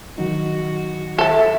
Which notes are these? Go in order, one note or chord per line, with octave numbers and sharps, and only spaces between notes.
D#3 F#3 D#4 F#4
A4 E5 A5